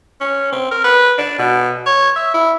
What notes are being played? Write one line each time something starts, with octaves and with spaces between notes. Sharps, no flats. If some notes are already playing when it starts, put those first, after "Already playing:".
C#4
C4
A#4
B4
D4
B2
C#5
E5
E4